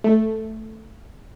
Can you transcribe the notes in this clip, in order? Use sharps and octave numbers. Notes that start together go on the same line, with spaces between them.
A3